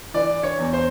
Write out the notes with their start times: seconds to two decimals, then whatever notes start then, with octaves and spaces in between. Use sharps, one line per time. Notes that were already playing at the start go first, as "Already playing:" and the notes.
0.14 E3 D5
0.43 C#5
0.59 E2
0.73 C5